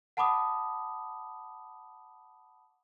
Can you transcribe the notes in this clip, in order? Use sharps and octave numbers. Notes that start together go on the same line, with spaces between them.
F#5 A5 B5 D6 D#6